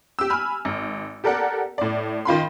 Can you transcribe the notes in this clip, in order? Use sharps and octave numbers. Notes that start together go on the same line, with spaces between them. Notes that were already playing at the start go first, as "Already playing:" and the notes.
G4 E6
G#5 B5 F6
G#1
G4 A4 A#4 D5 F#5
A2 D5
D#3 F4 B5 C6